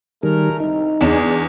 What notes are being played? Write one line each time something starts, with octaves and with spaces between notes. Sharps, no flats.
D#3 G3 A3 G#4 A#4
C2 D#4
E2 D4 G#4 E7